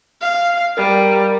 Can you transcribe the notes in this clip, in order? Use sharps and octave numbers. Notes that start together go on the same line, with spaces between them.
F5
G3 A#4